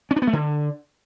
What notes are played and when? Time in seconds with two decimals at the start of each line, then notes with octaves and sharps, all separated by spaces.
0.11 C#4
0.16 D4
0.22 B3
0.27 A3
0.33 D3